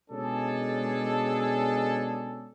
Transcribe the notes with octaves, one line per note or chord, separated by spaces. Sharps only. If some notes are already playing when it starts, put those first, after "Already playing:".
B2 G#3 C#4 D4 G#4 A4